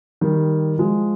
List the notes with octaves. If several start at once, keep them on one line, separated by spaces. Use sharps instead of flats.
D#3 G3
F3 G#3